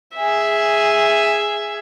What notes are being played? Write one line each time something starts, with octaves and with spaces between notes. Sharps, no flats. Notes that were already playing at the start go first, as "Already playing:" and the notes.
G#4 E5